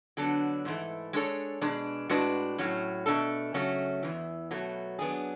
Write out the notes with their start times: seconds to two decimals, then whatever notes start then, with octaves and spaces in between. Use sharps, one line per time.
0.17 D3 F#3 B3 D4 A4
0.65 G#2 E3 A3
1.13 G#3 D4 A4 C#5
1.61 B2 G#3 D4
2.09 A2 G#3 D4 F#4 B4
2.58 A2 F#3 C#4
3.06 B2 A3 D4 A4
3.54 C#3 F#3 A3 C#4
4.03 E2 C#3 E3
4.51 B2 F#3 A3
4.99 F#3 B3 D4 G#4